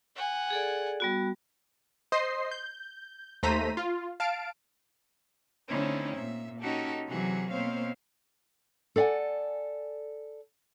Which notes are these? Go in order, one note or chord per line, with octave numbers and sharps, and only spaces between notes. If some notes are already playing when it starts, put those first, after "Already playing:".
F#5 G#5
G#4 A4 D5
G3 B3 F#4
C5 D#5 C6 C7
G6
D#2 A3 C5 A#5 B6 D#7
F4
F5 A5 D7
D3 A3 C4 C#4 D#4 E4
A#2 E5
C#4 D#4 F#4 G4 A4
C3 E3 F#3 F#4 G#4
B2 A#3 C4 C5 C#5 F5
A4 D5 F5 F#5 G#5